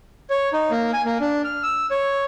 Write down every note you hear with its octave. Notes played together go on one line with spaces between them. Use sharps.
C#5
D#4
A#3
G#5
A#3
D4
F6
E6
C#5